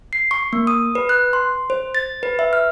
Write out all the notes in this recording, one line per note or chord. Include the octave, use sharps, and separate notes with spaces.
C7
C#6
A#3
D#6
B4
F#6
C6
C5
A6
B4
E5
F6